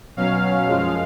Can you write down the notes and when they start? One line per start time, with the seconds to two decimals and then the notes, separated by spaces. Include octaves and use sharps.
0.17 B2 F#3 C#4 F5
0.67 F#2 F3 G#3